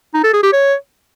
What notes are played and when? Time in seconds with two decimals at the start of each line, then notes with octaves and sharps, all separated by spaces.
0.14 D#4
0.24 A4
0.33 G#4
0.43 G4
0.53 C#5